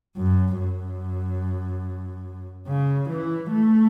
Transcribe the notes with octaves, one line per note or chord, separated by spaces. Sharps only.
F#2
F#2
C#3
E3
A3